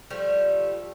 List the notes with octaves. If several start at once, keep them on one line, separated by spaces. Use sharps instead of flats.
F3 G3 A3